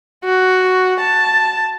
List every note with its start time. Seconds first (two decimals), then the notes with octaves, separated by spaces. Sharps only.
0.24 F#4
1.00 A5